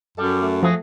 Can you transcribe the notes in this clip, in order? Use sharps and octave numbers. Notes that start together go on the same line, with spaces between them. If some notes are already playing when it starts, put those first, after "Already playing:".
F#2 G3 A4
A3
F3 A3 F#4 G#4